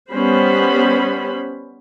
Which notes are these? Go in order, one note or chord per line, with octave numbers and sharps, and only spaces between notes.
G3 B3 C#4 C5 B5